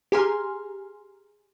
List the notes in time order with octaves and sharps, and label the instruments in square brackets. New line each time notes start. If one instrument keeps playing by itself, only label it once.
[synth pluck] G4 G#4 G#5 A#5 C6 F6